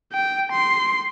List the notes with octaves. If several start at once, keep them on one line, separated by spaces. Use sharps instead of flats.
G5
C6